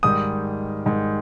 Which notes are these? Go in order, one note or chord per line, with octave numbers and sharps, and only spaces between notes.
G#2 D#3 G3 D#6
G#2 D#3 G3